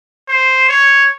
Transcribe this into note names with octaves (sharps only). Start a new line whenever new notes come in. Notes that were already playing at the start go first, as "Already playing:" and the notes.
C5
C#5